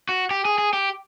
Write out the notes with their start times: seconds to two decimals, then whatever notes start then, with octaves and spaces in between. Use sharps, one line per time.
0.09 F#4
0.31 G4
0.45 G#4
0.58 G#4
0.73 G4